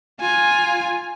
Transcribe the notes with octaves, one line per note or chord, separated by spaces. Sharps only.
F4 G#5